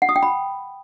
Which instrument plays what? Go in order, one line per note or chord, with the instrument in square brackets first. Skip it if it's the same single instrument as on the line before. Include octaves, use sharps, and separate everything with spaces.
[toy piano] F#5
D#6
G5
B5